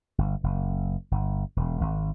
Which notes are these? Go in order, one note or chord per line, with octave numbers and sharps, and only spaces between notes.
G1
F#1
G1
E1
G#1